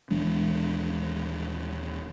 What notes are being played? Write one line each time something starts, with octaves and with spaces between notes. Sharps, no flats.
D#1 E3 G#3 D4